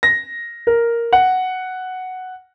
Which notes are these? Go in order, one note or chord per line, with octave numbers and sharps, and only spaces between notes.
A#6
A#4
F#5